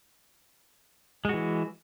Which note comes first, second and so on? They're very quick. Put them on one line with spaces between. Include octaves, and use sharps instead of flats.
G#3 F#4 E3